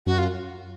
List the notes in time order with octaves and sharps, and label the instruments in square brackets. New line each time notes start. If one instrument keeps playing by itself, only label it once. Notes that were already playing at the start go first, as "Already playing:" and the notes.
[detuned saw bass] F#2 [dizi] F#4
[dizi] F4